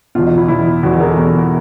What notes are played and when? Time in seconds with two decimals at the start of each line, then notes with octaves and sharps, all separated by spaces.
0.15 E2 B2 F4
0.27 D#4
0.38 E4
0.48 E2 B2 E4
0.83 E2 B2 F#4
0.92 G#4
1.00 A#4
1.08 A4
1.17 E2 B2